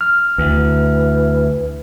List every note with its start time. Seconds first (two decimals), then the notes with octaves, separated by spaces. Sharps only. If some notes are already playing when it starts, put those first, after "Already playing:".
0.01 F6
0.38 D2 E3